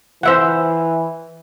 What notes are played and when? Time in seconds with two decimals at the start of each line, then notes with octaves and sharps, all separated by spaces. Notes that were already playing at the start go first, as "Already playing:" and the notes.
0.23 E3 C5 E5 F#5